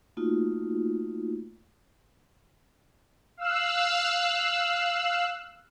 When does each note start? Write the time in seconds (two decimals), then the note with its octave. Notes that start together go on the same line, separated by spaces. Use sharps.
0.17 A3 A#3 D#4 F4 F#4
3.37 F5 E6 F#6